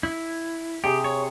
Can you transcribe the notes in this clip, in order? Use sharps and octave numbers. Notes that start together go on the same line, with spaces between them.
E4
C3 G4 G#4
C#5